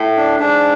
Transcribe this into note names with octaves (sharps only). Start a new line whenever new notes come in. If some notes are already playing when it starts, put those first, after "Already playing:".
Already playing: A2
D4
G#2 D4